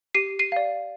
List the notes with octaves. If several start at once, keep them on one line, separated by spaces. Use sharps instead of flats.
G4 C7 D#7
C7 D#7
D5 F5